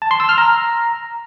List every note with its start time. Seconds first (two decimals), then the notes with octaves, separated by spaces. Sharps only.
0.02 A5
0.11 C6
0.20 E6
0.29 F6
0.38 A#5